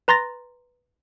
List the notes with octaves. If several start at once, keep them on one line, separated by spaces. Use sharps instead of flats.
B4 A#5 C6 A6 A#6